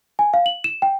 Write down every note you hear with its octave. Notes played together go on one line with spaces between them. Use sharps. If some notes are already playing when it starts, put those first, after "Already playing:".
G#5
F5
F#7
E7
G5